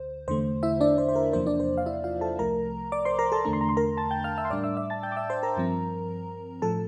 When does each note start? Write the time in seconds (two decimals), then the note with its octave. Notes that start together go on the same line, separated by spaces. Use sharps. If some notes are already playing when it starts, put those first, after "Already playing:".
Already playing: D2 D3 C5
0.28 E2 D3 A3 C5
0.63 E4 E5
0.81 D4 D5
0.98 C5
1.09 C5
1.16 A#4
1.33 E2 C3 F3 A#3 D4 C5
1.46 D4 D5
1.60 C5
1.78 F5
1.86 E4 E5
2.04 F4 F5
2.21 A4 A5
2.39 C2 C3 F3 A3 A#4 A#5
2.92 D5 D6
3.05 C5 C6
3.19 A#4 A#5
3.32 A4 A5
3.45 E2 D3 A3 D4 A#5
3.53 C6
3.61 A#5
3.69 C6
3.77 A#4 A#5
3.97 A5 A6
4.11 G5 G6
4.24 F5 F6
4.38 E5 E6
4.45 C6
4.50 A2 G3 D4 D5 D6
4.64 E5 E6
4.77 E5 E6
4.90 A5 A6
5.03 G5 G6
5.12 D6
5.17 E5 E6
5.30 C5 C6
5.43 A#4 A#5
5.57 G2 F3 C4
6.62 A2 F3 A4 A5